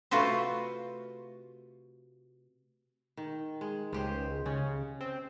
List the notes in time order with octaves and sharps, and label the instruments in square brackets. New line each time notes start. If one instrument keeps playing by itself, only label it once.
[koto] C3 A3 F4 F#4 B4 C5
[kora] D#3
G#3
[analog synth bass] C#2 [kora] G#3 G4 C5
[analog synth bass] C#3 [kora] C#4
[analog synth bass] C4